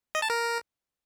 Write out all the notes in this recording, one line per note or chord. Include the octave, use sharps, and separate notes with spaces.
D#5
A5
A#4